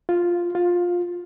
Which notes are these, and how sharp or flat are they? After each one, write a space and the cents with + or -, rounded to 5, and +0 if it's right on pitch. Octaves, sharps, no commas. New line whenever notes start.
F4 +0
F4 +15